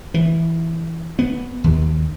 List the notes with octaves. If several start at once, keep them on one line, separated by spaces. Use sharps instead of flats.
E3
B3
D#2